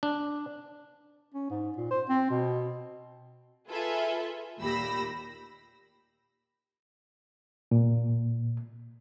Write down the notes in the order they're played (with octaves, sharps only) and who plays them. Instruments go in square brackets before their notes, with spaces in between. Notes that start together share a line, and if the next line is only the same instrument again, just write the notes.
[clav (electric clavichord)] D4
[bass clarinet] C#4
G#2
A#2
C5
C4
B2
[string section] F4 G#4 A4 B4 E5
D#2 A#2 G4 B5 E6 A#6
[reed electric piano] A#2